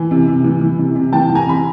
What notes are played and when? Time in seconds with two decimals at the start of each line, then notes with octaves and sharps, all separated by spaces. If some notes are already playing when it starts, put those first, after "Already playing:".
Already playing: E3 G#5
0.11 C3
0.28 C3
0.44 E3
0.61 E3
0.79 C3
0.95 C3
1.13 E3 G5 A5
1.30 E3
1.35 G#5 A#5
1.47 C3 B5